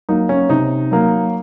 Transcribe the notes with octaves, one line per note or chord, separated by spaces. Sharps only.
F#3 A#3 D#4
C#4
C3 D#4
F#3 A#3